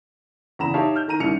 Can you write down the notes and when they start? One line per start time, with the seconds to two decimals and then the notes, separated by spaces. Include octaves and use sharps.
0.59 E2 C#3 A#5 B5 E7
0.74 D#4 G4 C#5 E5 F5 A5
0.96 F6 G6
1.08 D#3 A#5 D#7
1.20 C2 D#3 C#4 C#7 F7